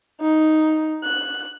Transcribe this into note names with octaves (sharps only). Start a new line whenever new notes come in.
D#4
F#6